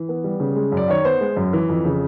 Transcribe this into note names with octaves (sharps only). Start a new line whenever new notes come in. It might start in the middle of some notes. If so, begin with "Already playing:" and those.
Already playing: E3
B3
G3
C#3
G#3
F#2
D5
D#3 C#5
B3 C5
G#3
F#2
E3
F2
C#3